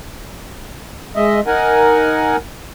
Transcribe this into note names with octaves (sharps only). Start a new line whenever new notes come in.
G#3 D#5 E5
D#4 A#4 F#5 G#5